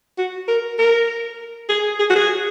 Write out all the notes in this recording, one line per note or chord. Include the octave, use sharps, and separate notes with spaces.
F#4
A#4
A#4
G#4
G#4
F#4
G#4